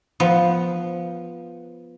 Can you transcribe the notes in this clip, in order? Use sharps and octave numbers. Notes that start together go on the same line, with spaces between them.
F3 B3